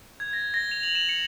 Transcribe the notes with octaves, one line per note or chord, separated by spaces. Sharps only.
G#6
A#6
A#6
F7
F#7
E7
C#7